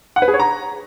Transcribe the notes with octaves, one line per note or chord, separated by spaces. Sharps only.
F#5
B4
G#4
C#5
A#5